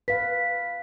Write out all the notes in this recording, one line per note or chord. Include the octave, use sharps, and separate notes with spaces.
B4 F5 B6